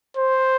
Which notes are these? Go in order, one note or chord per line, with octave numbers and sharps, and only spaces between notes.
C5